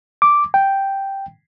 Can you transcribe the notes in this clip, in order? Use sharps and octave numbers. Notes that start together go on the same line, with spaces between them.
D6
G5